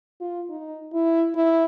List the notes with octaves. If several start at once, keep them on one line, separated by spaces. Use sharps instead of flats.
F4
D#4
E4
E4